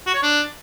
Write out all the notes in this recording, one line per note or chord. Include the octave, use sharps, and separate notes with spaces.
F#4
C#5
D4